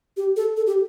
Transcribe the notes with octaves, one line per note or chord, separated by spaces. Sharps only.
G4
A4
A4
G4